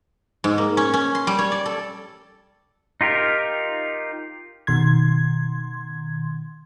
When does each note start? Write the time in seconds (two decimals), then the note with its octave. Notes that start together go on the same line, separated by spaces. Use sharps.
0.44 G#2
0.58 A#3
0.77 C#4
0.94 C#4
1.15 C6
1.27 G3
1.39 C#5
1.52 D5
1.66 A4
3.01 D#4 F4 G4 A#4
4.67 B2 D#3 C6 G#6